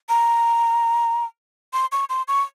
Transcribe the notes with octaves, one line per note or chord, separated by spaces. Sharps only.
A#5
C6
C#6
C6
C#6